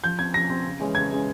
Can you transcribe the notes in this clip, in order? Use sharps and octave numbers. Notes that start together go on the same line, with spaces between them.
F3 G6
C4 G#6
F3 A#6
C4
C#3
E3 G#3 C#4
C#3 G#6
E3 G#3 C#4